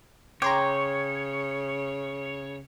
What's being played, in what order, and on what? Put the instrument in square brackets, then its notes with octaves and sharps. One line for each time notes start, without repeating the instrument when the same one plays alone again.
[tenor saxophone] C#3 [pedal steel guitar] C#5 [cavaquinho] G5 [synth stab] A#5 C6 D6